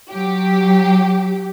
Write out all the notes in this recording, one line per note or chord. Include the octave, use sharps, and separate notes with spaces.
F#3 G4